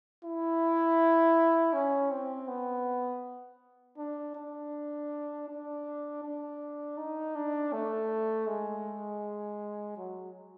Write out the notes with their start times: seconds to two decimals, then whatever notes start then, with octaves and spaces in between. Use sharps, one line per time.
0.24 E4
1.73 C#4
2.11 C4
2.48 B3
3.98 D4
4.35 D4
5.48 D4
6.23 D4
6.98 D#4
7.35 D4
7.73 A3
8.47 G#3
9.97 F#3